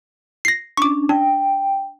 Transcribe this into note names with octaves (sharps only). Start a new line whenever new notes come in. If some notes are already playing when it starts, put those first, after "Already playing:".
A#6 C7
C#4 D4 C#6 D6
D4 G5